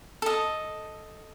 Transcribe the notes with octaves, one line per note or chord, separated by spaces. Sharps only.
A4 D#5